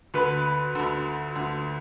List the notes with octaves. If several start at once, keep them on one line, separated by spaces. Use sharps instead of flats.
D2 D3 B4
D2 D3
D2 D3